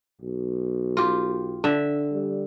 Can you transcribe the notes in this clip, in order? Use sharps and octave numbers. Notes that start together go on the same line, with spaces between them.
B1
F4 G4
D3 E5
G3